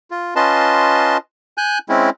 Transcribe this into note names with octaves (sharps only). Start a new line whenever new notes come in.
F4
C#4 F4 B4 D#5 A5 C6
G#5 F#6 G6
G#3 C4 C#4 E4